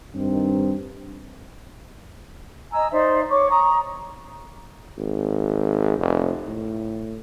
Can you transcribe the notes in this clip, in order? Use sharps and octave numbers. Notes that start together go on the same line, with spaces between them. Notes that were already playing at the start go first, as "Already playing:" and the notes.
G2 D#3 C4
D#5 G#5 A#5 E6
D#4 C5 D5 E5
C#5 C#6 D6
A#5 C#6 D#6
G#1
F1
A2